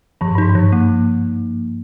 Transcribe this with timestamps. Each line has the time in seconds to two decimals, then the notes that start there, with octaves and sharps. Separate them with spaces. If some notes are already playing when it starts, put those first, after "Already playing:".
0.21 G2 F3
0.28 G#2
0.35 G2
0.38 G#2 D#4
0.49 G2
0.55 F3
0.72 A#3